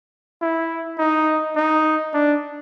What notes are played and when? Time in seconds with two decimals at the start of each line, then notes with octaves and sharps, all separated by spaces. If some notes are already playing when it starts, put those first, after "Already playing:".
0.42 E4
0.98 D#4
1.56 D#4
2.14 D4